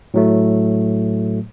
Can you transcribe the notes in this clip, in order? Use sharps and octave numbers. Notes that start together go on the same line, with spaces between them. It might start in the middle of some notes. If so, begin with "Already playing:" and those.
A2 F#3 A3